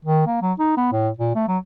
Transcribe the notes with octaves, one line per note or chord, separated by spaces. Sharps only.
D#3
A#3
F#3
D#4
B3
A2
A#2
A3
F#3